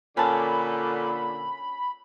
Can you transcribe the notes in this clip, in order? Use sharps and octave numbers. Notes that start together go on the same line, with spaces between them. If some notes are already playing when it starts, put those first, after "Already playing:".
A#2 D3 C#4 A5 B5